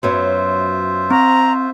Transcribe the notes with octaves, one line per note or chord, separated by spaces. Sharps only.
F#2 F#3 B3 F4 C5 E5
C4 A#5